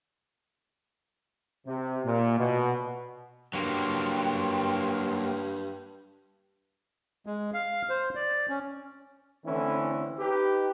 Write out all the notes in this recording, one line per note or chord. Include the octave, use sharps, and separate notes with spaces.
C3
A#2
B2
G2 F#3 A#3 G5 C6
G#3
F5
C5
D5
C#4
D3 E3 A3 C4 C#4 E4
D#4 G4 B4